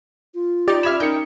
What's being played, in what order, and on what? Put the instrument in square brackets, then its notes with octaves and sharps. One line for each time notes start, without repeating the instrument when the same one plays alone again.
[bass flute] F4
[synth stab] D#4 G4 [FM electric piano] D5
[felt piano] E5 G#6 E7 [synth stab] B5 F6
[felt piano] D#4 A#4 C#7 [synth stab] G5